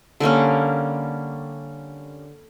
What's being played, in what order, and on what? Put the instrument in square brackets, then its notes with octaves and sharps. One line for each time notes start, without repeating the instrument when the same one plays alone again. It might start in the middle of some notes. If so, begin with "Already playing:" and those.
[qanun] D3 G3 A#3 C#4